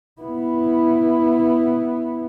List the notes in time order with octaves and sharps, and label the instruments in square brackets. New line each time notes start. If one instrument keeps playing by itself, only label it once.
[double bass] B3 E4